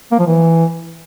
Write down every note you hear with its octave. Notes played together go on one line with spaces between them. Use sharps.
A#3
F3
E3